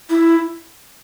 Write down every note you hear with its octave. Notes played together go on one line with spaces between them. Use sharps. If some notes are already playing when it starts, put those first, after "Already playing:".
E4